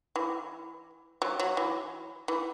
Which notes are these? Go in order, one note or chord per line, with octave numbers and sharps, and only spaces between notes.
E3
F#3
F#3
E3
E3